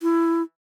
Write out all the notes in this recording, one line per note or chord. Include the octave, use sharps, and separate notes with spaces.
E4